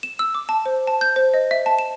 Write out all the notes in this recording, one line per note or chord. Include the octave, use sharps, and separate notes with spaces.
E7
E6
D6
A5
C5
A5
G6
C5
D#5
E5
A5
E7